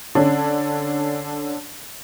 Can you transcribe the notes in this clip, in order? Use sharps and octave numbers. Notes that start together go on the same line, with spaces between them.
D3 C#4 D4